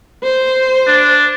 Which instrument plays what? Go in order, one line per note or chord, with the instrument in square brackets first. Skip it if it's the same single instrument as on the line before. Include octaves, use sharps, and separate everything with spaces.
[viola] C5
[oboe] D4